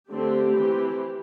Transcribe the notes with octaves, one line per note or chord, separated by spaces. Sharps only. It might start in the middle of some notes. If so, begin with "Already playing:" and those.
D3 A3 C4 G4
E3 C4